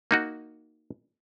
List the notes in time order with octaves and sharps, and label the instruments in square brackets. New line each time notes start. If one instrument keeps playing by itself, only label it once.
[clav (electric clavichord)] A#3 D#4 F#4